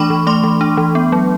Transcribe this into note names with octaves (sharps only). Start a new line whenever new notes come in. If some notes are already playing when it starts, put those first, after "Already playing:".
Already playing: E3 A3 D4 B5 C#6 D6
E3
A3 C6 D6
E3
D4
E3
B3
F#3